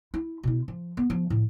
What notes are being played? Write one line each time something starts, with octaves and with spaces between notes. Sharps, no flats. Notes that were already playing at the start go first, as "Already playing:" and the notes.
E4
B2 E4
F3
B3
F3
A2 F3